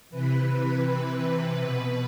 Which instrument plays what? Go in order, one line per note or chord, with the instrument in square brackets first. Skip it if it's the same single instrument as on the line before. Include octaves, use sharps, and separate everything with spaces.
[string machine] C3 E3 B4
B2 B4